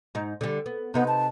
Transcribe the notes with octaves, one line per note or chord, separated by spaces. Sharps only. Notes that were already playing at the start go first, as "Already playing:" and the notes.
G#2 D#4
D3 G3
B3
C3 B3 D#4 B4
A5